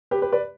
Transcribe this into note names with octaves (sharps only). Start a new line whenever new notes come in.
G4 B4
G4 B4
B4 D5